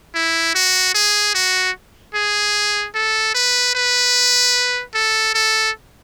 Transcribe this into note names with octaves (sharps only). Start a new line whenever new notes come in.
E4
F#4
G#4
F#4
G#4
A4
B4
B4
A4
A4